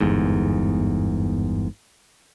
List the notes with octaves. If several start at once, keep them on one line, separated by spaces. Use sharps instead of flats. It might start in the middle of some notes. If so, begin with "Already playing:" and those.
G1 E2 G#2